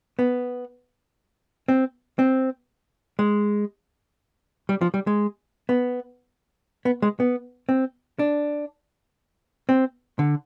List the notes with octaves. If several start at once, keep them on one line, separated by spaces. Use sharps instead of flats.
B3
C4
C4
G#3
G3
F3
G3
G#3
B3
B3
G#3
B3
C4
D4
C4
D3